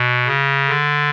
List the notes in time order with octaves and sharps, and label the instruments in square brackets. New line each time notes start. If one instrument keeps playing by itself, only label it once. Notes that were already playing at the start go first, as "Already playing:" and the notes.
Already playing: [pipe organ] B2
C#3
D3